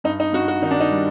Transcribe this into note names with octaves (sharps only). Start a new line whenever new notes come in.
G2 D#4
D#4
G2 F#4
F#4
D#3 D#4
D4
D#4
G3